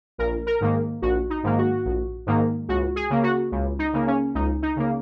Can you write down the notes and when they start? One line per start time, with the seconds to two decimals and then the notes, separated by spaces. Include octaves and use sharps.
0.18 A#1 A#4
0.46 A#4
0.60 G#2 D#3 A#3
1.02 A#1 F#4
1.30 D#4
1.43 G#2 D#3 A#3
1.58 F#4
1.85 A#1
2.26 G#2 D#3 A#3
2.68 C#2 F#4
2.96 G#4
3.10 C#3 A#3
3.23 F#4
3.51 C#2
3.79 D#4
3.93 C#3 A#3
4.07 C#4
4.35 C#2 D#4
4.62 D#4
4.76 C#3 A#3